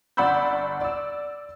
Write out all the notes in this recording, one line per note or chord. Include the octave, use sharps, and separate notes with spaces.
G1 D5 F#5 B5 E6 G6
D5 E6